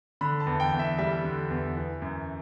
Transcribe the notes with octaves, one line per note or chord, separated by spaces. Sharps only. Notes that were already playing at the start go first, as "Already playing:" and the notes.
D3 B5
A5
E2
G5
E2
E5
G3 E5
D3
E2
E3
F#2